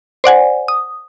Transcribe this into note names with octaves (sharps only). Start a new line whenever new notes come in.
C5 D5 F#5 G#5
D#6